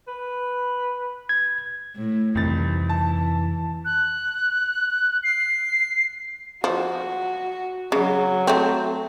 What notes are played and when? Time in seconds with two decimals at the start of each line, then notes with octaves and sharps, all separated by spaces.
0.08 B4
1.29 G#6
1.96 A2
2.35 C2 F2 C3 D#3 E3 A6
2.89 A5
3.85 F#6
5.24 C7
6.64 F3 F#4
7.92 C#3 F#3
8.47 A3 C4